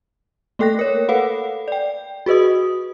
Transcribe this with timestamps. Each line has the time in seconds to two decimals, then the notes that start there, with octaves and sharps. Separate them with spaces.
0.59 A3 A#3 A4 G5 F#6 A#6
0.79 A#4 C#5
1.08 A4 B4 F5 F#5 B5
1.68 D5 G5
2.26 F#4 G#4 B4 D#5 D#6